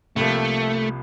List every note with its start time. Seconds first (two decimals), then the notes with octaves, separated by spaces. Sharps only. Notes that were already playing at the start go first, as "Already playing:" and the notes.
0.16 C2 C3 F3 A3 A#3